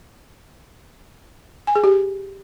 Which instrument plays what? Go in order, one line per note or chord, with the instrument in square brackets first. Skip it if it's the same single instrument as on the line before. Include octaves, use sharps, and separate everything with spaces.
[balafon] G#5
G#4
G4